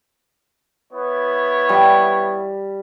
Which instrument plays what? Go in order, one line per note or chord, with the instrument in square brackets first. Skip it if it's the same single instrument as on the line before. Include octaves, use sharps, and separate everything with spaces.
[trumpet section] B3 E4 C#5
[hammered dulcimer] G3